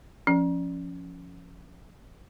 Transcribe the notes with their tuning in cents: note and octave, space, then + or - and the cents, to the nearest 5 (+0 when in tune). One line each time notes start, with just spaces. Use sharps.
F3 +0 C#4 +0